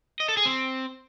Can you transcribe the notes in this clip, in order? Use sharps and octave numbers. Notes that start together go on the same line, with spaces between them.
D#5
A4
G#4
C4